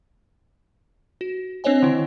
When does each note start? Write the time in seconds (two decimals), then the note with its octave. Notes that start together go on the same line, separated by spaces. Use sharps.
1.21 F#4
1.64 C4 D4 C5 C#5 D#5 G#5
1.83 D3 D#3 E4